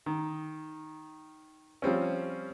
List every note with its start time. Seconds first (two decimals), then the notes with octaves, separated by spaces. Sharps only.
0.06 D#3
1.82 F3 G3 C4 C#4